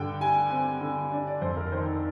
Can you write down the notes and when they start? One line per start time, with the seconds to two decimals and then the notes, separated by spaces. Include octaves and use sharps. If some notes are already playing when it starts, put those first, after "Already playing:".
Already playing: G2 D3 G5
0.21 G3 G#5
0.50 C4 G#5
0.81 D3
1.12 D4
1.27 D5
1.41 F2 C5
1.57 A#4
1.72 D#3 C5